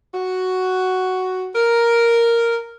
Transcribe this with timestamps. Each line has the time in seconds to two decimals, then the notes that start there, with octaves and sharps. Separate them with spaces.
0.15 F#4
1.55 A#4